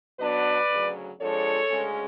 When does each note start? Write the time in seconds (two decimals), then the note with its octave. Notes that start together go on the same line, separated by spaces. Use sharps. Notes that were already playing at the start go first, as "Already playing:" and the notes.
0.19 B2 F#3 B3 D4 B4 D5
0.70 D2 C#3 F#3
1.20 F2 F3 G#3 D4 A4 C#5
1.70 D2 C#3 G#3 C#4